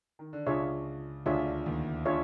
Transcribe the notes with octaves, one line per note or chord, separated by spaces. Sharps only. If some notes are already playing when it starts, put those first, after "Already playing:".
D#3
D3
C#2 C#3 D4 F4 G#4 C#5 E5
D2 D3 D4 F4 G#4 C#5 E5
D#2 D#3
D4 F4 G#4 C#5 E5